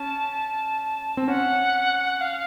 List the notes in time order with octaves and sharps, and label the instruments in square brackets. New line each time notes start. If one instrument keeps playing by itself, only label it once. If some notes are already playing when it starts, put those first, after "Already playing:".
Already playing: [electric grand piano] C#4 [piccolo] A5
[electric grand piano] C4
[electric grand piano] C#4 [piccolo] F#5
[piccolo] F5